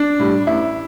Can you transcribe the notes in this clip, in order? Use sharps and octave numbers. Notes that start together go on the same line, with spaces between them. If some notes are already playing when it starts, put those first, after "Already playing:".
Already playing: D4
A2 G3
A1 E4